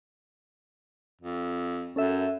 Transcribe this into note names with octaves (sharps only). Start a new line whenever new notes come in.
F2
F#2 C#4 A4 E5